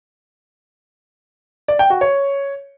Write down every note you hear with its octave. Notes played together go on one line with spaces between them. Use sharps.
D5
G5
F#4
C#5